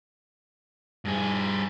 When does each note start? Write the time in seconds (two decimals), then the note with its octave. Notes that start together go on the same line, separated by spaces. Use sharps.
1.05 G2 G#4